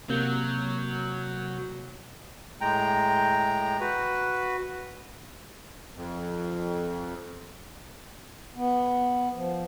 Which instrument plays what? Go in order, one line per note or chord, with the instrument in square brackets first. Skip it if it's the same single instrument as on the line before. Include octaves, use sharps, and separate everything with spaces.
[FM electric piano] C3 A#3 G6 [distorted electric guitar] F#3
[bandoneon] A2 G#3 G5 A#5
F#4 B4
[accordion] F2
[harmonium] B3
F3